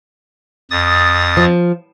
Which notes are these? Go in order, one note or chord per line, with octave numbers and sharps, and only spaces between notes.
F2 D#6 A6
F3